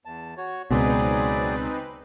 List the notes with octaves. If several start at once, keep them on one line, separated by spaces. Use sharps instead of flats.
E2 A5
F#4 C#5
C#2 B2 F#3 C4 D#4 G#4 B4 D5